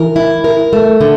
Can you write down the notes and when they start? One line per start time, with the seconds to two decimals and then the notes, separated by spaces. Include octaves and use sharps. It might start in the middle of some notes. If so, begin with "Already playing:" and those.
Already playing: E3 A#4
0.16 E4
0.44 A#4
0.73 A3
1.00 D3